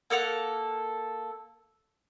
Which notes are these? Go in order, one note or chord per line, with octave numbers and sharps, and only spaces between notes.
A#3 A4 F#5 F6